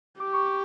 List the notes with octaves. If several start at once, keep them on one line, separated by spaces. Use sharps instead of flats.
G4 D6
C#6
D6